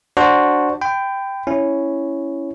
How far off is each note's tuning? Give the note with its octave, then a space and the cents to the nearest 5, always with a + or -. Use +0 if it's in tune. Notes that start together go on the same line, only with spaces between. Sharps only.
D4 +0 F#4 +0 C5 +0
G5 +0 B5 +35
C#4 +0 E4 +0